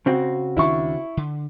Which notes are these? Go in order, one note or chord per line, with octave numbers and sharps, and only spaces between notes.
C#3 C4 F#4
D2 D#3 D4 E4 C#6
D3